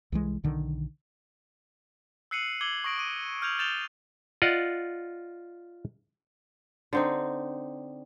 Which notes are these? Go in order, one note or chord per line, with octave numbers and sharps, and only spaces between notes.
C2 E3 G#3
B1 D3 D#3
E6 F#6 C7 C#7 D#7 F#7
D6 E6 G#6 F#7 G7
C#6 D#6 A#6 D7 F#7
D6 D#7
F6 G6 G#6 F7 F#7
G6 A6 E7 F7 G7
F4 D5 D#5 F#5
D3 C4 D#4